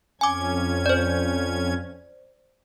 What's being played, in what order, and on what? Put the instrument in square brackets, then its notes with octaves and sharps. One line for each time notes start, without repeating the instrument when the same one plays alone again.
[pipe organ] F2 C#4 G#6 [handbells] G#5 D6
[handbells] C5 D5